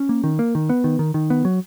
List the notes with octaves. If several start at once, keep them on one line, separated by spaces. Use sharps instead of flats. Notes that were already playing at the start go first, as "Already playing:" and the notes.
Already playing: C#4
A#3
D#3
A#3
D#3
B3
D#3
D#3
D#3
B3
F#3